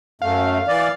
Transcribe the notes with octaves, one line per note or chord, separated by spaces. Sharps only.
F#2 A3 F5
E3 D5